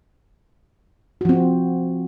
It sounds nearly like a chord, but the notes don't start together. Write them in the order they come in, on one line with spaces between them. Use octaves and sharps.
F#4 F3 C4